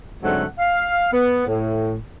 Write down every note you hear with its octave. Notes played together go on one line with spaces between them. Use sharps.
G#2 D3 F#3 A3 C4 F#5
F5
B3
A2